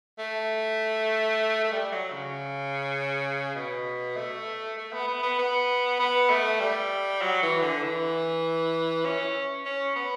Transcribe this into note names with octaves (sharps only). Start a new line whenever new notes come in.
A3
A3
G3
F#3
C#3
B2
A3
A3
B3
B3
B3
B3
B3
A3
G3
F#3
E3
D3
E3
C#4
C#4
B3